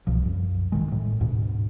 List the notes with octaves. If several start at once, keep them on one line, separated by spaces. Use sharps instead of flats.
C2 B2 F3
F#2
A1 B2 D#3 G#3
A2
D2 G#2 B2